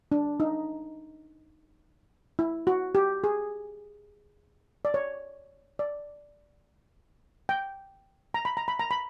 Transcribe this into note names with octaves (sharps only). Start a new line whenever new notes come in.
D4
D#4
E4
F#4
G4
G#4
D5
C#5
D5
G5
A#5
B5
A#5
B5
A#5
B5